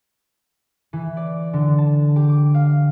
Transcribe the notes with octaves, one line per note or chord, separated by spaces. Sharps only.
E3
D5
D3
A5
G4
D6
F5